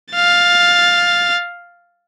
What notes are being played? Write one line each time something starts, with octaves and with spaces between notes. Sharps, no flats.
F5 A6